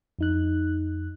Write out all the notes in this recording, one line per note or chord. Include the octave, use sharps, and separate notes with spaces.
F2 D#4 F#6